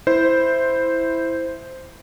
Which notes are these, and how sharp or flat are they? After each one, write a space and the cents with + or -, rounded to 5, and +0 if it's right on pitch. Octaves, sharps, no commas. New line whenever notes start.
E4 +0 C5 -5